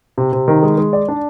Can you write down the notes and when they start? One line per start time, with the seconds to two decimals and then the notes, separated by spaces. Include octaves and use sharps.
0.18 C3
0.33 C3
0.48 D#3
0.63 G#3
0.78 G#3
0.93 D5
1.08 D4